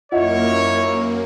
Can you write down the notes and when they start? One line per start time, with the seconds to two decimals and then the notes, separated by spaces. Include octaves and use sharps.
0.12 F#2 A#3 E4 F4 C#5 D#5 F#5